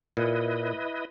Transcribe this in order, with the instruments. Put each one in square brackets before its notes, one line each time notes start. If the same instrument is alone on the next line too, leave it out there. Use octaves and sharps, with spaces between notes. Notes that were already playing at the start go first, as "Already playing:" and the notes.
[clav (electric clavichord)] A#2 [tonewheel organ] E4 B4 D#5